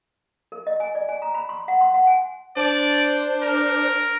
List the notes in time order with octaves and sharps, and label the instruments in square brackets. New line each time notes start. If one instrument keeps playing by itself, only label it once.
[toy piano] A#4
D#5
G#5
D5
G#5
A#5
B5
C6
F#5
C6
F#5
G#5
[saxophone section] D4 C5 [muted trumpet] D5
[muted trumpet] A#4